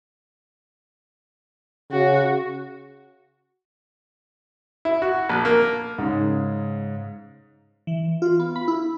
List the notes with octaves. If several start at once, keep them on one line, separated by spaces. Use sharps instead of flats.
C#3 F#4
E4
F#4
A#1
A#3
G#2 C#3
E3
F4
B3
B5
E4